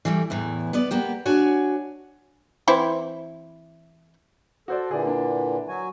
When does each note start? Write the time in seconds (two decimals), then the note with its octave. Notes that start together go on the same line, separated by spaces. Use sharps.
0.05 E3 G3 A3
0.30 E2 A2 E3
0.73 B3 B4 D5
0.91 A#3 B3 G4
1.26 D4 F#4 C#5 G#5
2.68 E3 C4 E4
4.68 F#4 A4 C5 D5
4.91 A#2 D3 E3 G#4 D5
5.03 A#3 D4
5.68 F#3 F#4 G#5